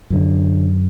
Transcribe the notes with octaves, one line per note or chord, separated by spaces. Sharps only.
F#2 D3